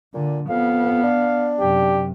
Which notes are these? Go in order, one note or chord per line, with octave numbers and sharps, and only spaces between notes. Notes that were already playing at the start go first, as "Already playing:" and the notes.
A#2 D3
F2 B3 F5
D4
F#2 C3 G4